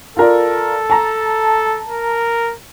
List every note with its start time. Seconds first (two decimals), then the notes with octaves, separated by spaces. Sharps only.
0.17 F4 A4 A#4 D5
0.90 A5 A#5
1.88 A#4